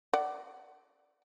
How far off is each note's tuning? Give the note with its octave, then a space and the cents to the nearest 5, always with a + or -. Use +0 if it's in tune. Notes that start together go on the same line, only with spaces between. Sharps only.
D5 +0 F#5 +25